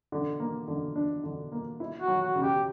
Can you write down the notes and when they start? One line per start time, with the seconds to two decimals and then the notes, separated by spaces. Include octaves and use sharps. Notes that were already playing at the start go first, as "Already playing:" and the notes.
0.12 D3
0.40 A#3
0.68 D3
0.96 D4
1.24 D3
1.52 A#3
1.80 E4
2.01 F#4
2.07 F#3
2.22 F#4
2.35 C#3
2.42 G4